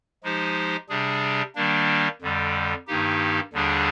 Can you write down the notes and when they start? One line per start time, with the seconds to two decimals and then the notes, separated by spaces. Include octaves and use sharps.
0.24 F3 G#3 D#4 G4 C5
0.89 C3 G3 D4 G#4
1.55 D#3 G3 A#3 D4
2.21 F2 D3 G3
2.87 G2 D#3 A#3 D#4 G4
3.53 D#2 D3 G3 D4 G#4